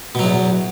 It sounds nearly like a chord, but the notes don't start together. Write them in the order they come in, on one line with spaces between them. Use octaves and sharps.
B2 F#3 E2